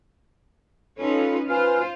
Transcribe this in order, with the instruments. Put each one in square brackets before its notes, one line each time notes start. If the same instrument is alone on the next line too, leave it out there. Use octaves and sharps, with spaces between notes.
[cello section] C#4 D#4 B4 [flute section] F4 A4
[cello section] F4 C5 [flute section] B4 G#5 F6